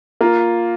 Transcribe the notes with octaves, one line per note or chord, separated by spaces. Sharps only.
A#3 F4